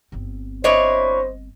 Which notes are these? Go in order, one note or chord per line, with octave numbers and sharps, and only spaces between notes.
G1 C4
D4 E4 C5 C#5 D#5